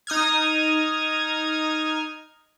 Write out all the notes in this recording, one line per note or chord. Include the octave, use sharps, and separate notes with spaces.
D#4 D#6 F6 G#6